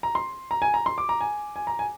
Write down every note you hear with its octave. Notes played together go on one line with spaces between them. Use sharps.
A#5
C6
A#5
G#5
A#5
C6
D6
A#5
G#5
G#5
A#5
G#5